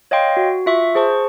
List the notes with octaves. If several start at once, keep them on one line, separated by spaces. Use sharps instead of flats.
C#5 D#5 F5 G5 C6
F#4
F4 E5 C#6
G#4 C5 A5 C#6